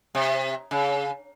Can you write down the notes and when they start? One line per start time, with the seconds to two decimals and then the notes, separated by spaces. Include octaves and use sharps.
0.15 C3
0.71 C#3